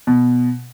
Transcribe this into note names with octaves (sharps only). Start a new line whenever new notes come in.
B2